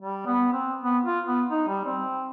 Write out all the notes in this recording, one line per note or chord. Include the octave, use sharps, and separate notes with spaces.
G3
B3
C4
B3
F4
B3
D#4
G3
C4